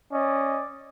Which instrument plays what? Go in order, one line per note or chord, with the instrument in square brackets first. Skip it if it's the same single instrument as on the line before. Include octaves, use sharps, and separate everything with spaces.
[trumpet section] C#4 D5 D#5